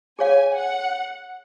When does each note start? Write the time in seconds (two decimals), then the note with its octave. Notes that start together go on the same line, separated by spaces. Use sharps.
0.19 G#4 C#5 F5 G#5
0.53 F#5